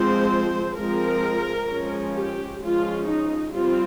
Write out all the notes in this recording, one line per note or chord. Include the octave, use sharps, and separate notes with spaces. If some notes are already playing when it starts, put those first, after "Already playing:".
Already playing: F3 G#3 C4 C5
F3 G#3 C4 A#4
F3 G#3 C#4
G4
F3 G#3 C#4 F4
D#4
G3 C4 F4